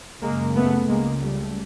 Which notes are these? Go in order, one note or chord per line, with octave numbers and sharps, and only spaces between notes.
F#2 C#3 G#3 A#3
A3 B3
C#2 C#3 G#3 A#3
G3 A3